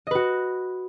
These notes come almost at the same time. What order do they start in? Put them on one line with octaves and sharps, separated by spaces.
D#5 B4 F#4